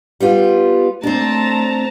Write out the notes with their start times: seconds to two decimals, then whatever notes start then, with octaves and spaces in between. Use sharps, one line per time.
0.20 G3 B3 F4
1.03 A3 C4 D4 A5 A#5